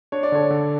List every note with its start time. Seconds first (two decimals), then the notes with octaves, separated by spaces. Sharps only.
0.12 D4 C#5
0.23 D5
0.32 D3 A4 C#5
0.50 D3